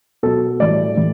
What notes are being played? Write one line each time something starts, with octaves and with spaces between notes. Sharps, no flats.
B2 F#3 A4
A2 E3 G3 D5
A2 E3